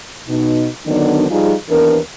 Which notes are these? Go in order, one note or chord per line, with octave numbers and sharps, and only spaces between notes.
B2 D#4
D3 D#3 F#3 B3 D4 D#4
F3 G3 D#4 F4 G#4
D#2 E3 B3 D4 A#4